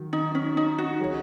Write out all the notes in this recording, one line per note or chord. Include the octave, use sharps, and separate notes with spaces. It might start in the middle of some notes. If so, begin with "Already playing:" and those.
Already playing: D#3 F#3
D#4
C#4
D#4
F#4
F#3 C#4 G#4 C#5